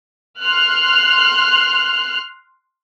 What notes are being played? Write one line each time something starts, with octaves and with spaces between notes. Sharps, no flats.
C6 F6 F#6